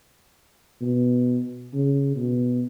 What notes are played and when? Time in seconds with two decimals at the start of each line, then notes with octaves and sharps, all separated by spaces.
0.81 B2
1.73 C#3
2.16 B2